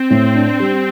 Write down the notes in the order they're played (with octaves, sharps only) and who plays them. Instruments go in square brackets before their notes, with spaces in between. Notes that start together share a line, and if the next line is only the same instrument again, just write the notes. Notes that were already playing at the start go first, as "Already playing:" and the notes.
Already playing: [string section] C4
[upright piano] A2
D4
G3